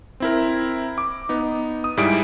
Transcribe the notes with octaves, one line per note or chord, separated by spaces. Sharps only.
C4 E4 A#4
D6
B3 D#4
D#6
G#2 G3 E4 G#4 D7